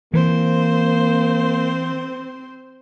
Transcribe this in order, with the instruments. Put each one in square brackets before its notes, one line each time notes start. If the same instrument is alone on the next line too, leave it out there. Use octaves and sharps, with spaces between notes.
[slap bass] E3 [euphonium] A#3 [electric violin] C4 C5